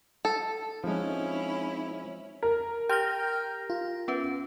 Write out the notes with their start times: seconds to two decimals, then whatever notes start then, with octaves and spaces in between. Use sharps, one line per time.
0.25 A4
0.84 F3 G#3 C4 C#4 D#4 E4
2.43 A#4
2.89 G4 G5 F6 G6 A#6
3.70 F4
4.08 B3 C#4 B4